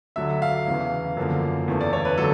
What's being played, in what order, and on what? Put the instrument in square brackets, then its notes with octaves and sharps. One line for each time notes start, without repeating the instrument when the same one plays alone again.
[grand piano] D2 D3 F#3 E5
F5
E2 C#3 E3
F#2 D3 F3 A#3
E2 C#3 E3 A3
D5
C#5
B4
D3 F#3 A3 A4